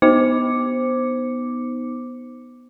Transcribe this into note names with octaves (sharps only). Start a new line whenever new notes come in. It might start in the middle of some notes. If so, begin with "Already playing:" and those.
B3 D#4 C5 D6 C#7